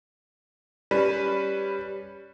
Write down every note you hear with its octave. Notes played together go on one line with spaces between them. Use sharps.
G3 C#4 B4